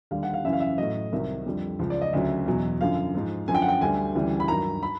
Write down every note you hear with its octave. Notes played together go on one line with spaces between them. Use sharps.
D#2 D3 G3 F5
F#5
F5
F#2 C#3 E3 E5
F5
E5
A2 F#3 D#5
C2 C3 D#3 F#3 E5
F2 D3 G3
C#2 C#3 F3
D5
D#5
D2 C#3 F#3 E5
E2 B2 F#3
F#2 D3 F3 F5
G#2 F3
F#2 D3 F3 G#5
G5
F#5
G5
D2 D3 G3 G#5
D2 C#3 E3 G3
B5
G2 D#3 F#3 A#5
B5